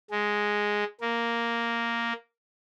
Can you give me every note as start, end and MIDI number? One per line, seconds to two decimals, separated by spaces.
0.11 0.84 56
1.01 2.13 58